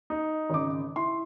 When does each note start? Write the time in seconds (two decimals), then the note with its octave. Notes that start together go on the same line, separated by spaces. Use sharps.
0.10 D#4
0.50 G#1 C#3 D6
0.96 E4 C6